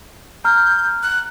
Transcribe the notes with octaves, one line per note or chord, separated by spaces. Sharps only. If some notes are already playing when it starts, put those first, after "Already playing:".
A#5 F6 G6
F#6